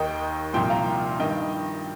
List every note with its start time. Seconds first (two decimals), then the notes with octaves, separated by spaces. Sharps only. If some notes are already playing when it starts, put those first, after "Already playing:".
Already playing: D#2 D#3 D#5 G5
0.53 C2 A#2 F3 G5 C6
0.70 F5 A#5
1.19 G2 D#3 D#5 G5